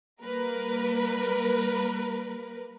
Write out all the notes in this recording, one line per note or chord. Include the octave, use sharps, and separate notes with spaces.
G3 A#3 A#4 B4